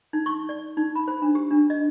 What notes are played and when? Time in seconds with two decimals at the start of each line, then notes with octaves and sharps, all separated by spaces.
0.13 D#4
0.26 C#6
0.49 D5
0.77 D#4
0.95 B5
1.08 C5
1.22 D4
1.35 G4
1.51 D4
1.70 D#5